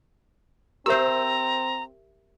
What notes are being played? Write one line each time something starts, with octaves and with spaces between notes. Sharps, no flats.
C4 G4 A#4 C5 E5 A#5 E6